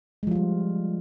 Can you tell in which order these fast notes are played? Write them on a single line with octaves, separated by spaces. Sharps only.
G#3 F3 F4 G3